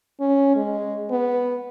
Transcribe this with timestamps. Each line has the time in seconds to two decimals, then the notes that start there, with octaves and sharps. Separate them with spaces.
0.20 C#4
0.55 G#3
1.11 B3